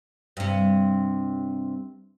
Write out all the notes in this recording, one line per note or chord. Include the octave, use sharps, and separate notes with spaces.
G2 C3